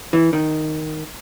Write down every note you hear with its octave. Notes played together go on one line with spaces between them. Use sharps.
E3
D#3